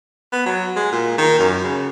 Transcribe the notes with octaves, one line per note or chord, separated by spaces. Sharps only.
B3
F#3
G#3
A#2
D#3
F#2
C#3